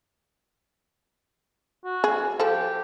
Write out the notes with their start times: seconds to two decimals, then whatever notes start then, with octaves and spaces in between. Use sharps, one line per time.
1.84 F#4
2.04 G#4
2.39 F3 G4 A4 C5